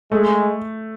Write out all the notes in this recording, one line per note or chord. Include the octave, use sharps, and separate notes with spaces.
G#3 A3